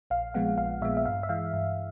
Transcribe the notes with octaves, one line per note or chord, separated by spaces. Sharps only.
A#1 F5
A#2 F3 G#3 B3 F#5
A#1 F5
A#2 F3 G#3 B3 E5
E5
G2 F5
E5
E3 G#3 F5
G2